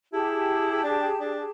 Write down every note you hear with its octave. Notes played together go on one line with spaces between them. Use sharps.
E4 G4 G#4 A5
D4
D4